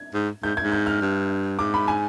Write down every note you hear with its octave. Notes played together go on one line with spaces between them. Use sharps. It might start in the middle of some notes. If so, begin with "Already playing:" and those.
Already playing: G#6
G#2
G#2 G6
G#2 G#6
G6
F6
G2
G#2 D6
B5
G#5